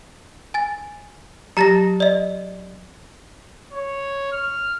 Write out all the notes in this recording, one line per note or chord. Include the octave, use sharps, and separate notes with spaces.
G#5 A6
F#3 G4 A5 A#5 A6 A#6
D5 D#5
C#5
F6